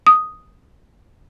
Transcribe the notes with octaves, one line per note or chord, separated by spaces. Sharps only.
D#6